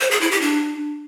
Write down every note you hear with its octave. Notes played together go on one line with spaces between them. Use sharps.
C5
G#4
E4
G4
D4